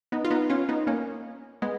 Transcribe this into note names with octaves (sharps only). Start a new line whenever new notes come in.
B3 D#4
F4
B3 D#4
C#4 F4
B3 D#4
A#3 C#4
G#3 B3